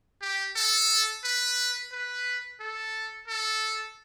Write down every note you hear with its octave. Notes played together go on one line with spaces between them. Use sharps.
G4
A4
B4
B4
A4
A4